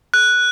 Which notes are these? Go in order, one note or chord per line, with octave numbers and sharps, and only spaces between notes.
F#6